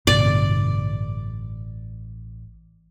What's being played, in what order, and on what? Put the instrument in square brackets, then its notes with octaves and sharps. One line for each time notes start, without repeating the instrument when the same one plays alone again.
[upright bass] A1 [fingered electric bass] G2 B2 D3 [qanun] D5